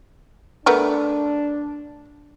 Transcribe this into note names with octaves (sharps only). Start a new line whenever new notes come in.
A3 B3 D4 A#4